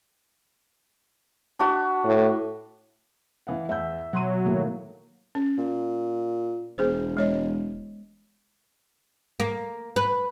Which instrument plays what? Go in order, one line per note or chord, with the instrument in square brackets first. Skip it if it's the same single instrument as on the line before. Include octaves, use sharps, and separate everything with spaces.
[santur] D4 F#4 B5
[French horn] A2
[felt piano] E3 F5 F#5
[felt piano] E2 F#5 G6 [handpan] E5
[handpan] B2 [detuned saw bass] F#3 [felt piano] F#5 C6 D#7
[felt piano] A2 A3 [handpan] D#3 A#3
[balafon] C#4
[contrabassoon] A#2
[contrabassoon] E1 [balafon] B3 G#4 C5
[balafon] G#3 C#5 D#5
[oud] A#3
B4